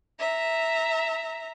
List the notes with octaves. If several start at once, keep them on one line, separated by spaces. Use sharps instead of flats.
E5 A#5